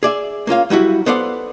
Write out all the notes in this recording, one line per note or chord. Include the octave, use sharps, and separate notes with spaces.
G#4 D5 E5
A#3 C#4 F4 F5
F#3 G3 E4 F#4
B3 A4 C5 D5 F#5